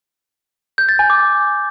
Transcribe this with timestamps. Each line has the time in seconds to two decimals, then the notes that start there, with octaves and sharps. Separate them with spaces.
0.78 G6
0.89 A6
0.99 G#5
1.10 D6